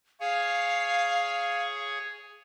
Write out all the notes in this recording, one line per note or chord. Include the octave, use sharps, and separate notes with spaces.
G#4 C#5 F5